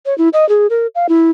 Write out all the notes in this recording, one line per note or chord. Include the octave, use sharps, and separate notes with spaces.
C#5
E4
D#5
G#4
A#4
F5
E4